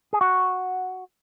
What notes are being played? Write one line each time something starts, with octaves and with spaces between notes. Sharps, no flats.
G#4
F#4